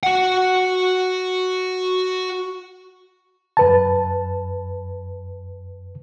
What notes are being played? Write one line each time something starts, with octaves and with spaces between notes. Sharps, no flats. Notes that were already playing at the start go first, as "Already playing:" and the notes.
F#4 F#5
F#2 B4 A5